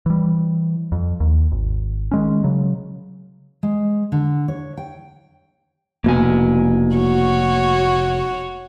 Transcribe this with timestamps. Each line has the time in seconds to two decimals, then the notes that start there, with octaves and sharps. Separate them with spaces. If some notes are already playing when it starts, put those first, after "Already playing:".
0.06 E3 G3
0.92 F2
1.20 D#2
1.52 G#1
2.11 D#3 G#3 C#4
2.44 C#3 F#3
3.63 G#3
4.12 D3
4.48 C#5
4.77 G5
6.04 F1 B2 A#3 G#5
6.96 F#4 C#5